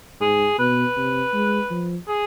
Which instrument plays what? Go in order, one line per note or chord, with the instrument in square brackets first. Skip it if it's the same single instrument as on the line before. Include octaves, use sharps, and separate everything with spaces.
[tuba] G#2 [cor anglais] G#4
[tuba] B2 [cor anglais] B4
[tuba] C3
G#3
F3
[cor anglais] G#4